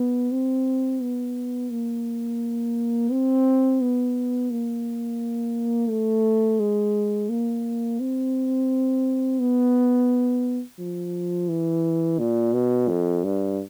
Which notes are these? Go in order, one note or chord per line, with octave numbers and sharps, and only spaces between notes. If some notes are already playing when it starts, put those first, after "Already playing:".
Already playing: B3
C4
B3
A#3
C4
B3
A#3
A3
G#3
A#3
C4
B3
F3
E3
A#2
B2
F2
G2